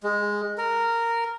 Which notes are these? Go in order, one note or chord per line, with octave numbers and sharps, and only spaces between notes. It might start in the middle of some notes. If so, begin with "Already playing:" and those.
G#3
A#4